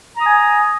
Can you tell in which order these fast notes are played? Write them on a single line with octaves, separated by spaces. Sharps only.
A#5 D#6 G#5